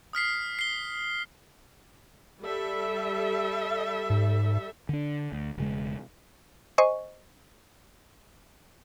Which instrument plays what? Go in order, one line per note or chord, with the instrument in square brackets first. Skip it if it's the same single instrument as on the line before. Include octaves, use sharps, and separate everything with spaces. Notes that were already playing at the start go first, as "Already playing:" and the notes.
[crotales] D#6 F6 B6 C7
C7 G7
[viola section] G3 A4 E5
[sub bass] G#2
[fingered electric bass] D3 D4
D2
E1 C#3 G#3
[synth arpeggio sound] C5 D#5 G#5 C#6